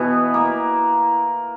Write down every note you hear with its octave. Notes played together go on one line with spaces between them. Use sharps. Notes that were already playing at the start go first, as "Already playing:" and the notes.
Already playing: B2 E3 B3 E4
A#3